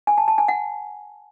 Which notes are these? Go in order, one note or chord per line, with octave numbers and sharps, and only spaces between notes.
G#5
A5
A5
G#5
F#5